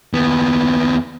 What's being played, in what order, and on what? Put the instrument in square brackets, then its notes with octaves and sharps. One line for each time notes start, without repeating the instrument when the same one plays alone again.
[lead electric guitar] D#2 B3